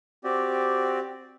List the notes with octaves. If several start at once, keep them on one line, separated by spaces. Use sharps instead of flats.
C4 F#4 G4 D5